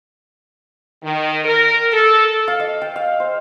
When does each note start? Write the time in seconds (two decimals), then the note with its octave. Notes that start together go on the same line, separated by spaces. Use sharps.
1.03 D#3
1.44 A#4
1.92 A4
2.48 F5
2.60 D#5
2.82 G5
2.96 F5
3.20 C5